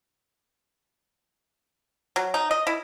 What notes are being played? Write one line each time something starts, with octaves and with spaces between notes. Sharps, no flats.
F#3
D#4
D#5
E4